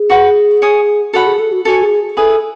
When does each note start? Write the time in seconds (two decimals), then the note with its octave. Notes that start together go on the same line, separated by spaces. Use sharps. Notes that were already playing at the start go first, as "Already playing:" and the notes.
Already playing: G#4
0.10 F#4 B4 F#5 C#6
0.62 C#5 G#5 D#6
1.13 F#4 A4 C#5 F#5 B5
1.26 G#4
1.39 A4
1.52 F#4
1.65 F#4 A4 C#5 G#5 C#6
1.83 G#4
2.17 E4 G#4 A4 B4